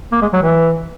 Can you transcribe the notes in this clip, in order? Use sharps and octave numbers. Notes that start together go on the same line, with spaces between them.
A#3
G#3
F#3
E3